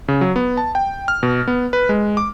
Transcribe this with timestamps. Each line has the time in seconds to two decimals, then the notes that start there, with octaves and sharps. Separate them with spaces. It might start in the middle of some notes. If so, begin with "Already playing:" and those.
0.08 C#3
0.21 F#3
0.36 B3
0.57 A5
0.75 G5
1.08 F6
1.23 B2
1.48 B3
1.73 B4
1.89 G#3
2.17 D6